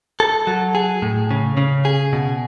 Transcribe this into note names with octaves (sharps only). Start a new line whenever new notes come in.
A4
F#3
G#4
A2
C#3
C#3
G#4
B2